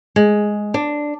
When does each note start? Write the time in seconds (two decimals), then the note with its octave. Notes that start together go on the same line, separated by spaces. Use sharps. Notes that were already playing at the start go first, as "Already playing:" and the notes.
0.16 G#3
0.74 D4